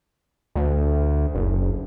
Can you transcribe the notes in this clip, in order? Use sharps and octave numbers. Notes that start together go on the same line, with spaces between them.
D2
F#1